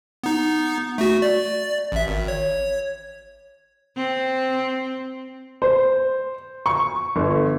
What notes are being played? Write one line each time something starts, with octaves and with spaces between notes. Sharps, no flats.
B3 D#4
A3 F#4
D5
A1 E5
G#1
C#5
C4
C5
C#6
G1